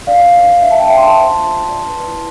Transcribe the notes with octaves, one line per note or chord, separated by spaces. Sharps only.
D4 D5 F5
B4
D4
D4 E5
A5
D5 E5 G5
D4 A5 C6
C5
F4
F4
D5
B4
E4